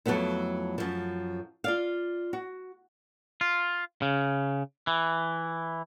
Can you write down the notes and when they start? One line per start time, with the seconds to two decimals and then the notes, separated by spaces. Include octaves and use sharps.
0.06 F2 F#3 A3 B3 E4
0.78 F#2 F3
1.64 F4 D5 F5
2.33 F#4
3.41 F4
4.02 C#3
4.87 E3